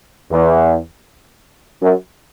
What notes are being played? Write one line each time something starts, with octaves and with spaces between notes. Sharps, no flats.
E2
F#2